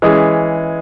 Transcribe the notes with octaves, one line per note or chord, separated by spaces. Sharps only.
E3 G#3 C#4 G#4